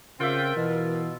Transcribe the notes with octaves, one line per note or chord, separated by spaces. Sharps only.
C#3 C4 F4 A#4 D5 E5 G5
B2 E3